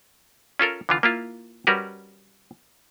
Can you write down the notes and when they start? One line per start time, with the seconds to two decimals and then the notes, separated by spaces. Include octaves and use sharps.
0.60 C#4 F4 A4 A#4
0.89 D3 E3 F4
1.03 A#3 E4 F4
1.67 G3 C#4 F#4 A#4 B4